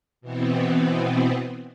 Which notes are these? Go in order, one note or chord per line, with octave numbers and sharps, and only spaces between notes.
B2 E3 B3 C4